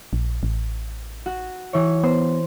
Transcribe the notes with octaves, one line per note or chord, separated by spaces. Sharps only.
A#1
A1
F#4
E3 C#5
B3 C5